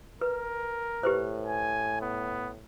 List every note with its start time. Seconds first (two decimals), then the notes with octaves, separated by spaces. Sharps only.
0.21 A#4 B4
1.03 A2 G4 B4 C5
1.46 G#5
2.02 B3